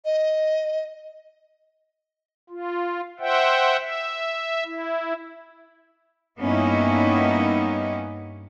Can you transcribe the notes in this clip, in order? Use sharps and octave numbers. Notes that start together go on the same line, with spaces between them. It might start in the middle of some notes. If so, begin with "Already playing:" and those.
D#5
F4
C5 E5 F#5 G5
E5
E4
G2 A#3 B3 C#4 D#4 E4